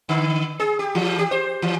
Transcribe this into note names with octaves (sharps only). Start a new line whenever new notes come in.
D3
G#4
G4
E3
G4
C5
E3